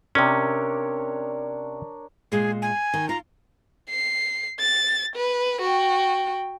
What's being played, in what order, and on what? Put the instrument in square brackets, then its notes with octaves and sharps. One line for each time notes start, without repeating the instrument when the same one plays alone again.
[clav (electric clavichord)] C3 C#4 [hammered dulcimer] D4 A#4 C#5
[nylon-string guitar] A#2 G#3 [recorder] G#4
[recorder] G#5
[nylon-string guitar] D#3
[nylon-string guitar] F4 [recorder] A#5
[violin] C7
A6
B4
F#4 G5